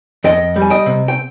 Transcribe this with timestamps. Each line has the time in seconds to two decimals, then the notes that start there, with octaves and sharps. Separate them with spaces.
0.24 F2 D#5 G5
0.56 G3
0.62 G#5
0.70 D#5 G5
0.86 C3
1.08 G5